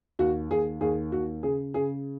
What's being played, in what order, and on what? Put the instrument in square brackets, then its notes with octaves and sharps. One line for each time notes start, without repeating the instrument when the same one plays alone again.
[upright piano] D#2 F#4
D#2 G#4
D#2 G#4
D#2 F#4
C#3 G#4
C#3 G#4